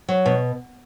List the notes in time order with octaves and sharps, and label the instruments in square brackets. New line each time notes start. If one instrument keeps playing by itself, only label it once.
[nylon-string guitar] F#3
B2